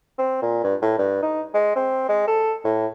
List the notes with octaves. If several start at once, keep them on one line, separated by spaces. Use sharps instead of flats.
C4
A#2
G2
A2
G2
D#4
G#3
C4
G#3
A4
A2